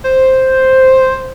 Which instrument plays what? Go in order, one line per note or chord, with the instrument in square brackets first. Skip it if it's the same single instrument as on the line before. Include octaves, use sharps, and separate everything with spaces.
[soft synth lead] C5